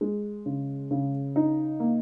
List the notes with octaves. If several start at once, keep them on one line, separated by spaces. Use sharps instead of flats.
G#3
C#3
C#3
D#4
A#3